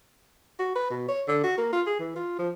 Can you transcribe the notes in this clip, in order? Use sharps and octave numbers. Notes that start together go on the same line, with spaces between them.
F#4
B4
B2
C#5
D3
F#4
A#3
F4
G#4
E3
F4
F3